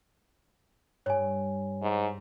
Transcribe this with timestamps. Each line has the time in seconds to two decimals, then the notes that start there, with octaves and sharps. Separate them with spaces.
1.06 G2 C#5 G#5
1.82 G#2